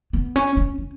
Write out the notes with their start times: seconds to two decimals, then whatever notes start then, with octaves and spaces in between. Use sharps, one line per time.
0.13 B3
0.36 C#4
0.57 C#4
0.78 C#4